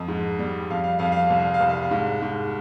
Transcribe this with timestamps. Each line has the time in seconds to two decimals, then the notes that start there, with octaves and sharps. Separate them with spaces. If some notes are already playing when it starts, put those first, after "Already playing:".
Already playing: F2 D#5
0.08 G#2
0.39 G3
0.70 F2 F5
0.84 F5
0.99 F2 F5
1.12 F5
1.27 F5
1.30 C2
1.40 F5
1.54 F5
1.61 C2
1.69 F5
1.83 F5
1.91 G#2
2.22 G#2